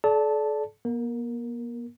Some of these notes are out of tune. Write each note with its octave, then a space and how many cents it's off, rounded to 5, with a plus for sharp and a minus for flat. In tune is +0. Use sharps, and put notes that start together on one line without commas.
A4 -40 D5 -15 A5 +0
A#3 +45 A#4 +0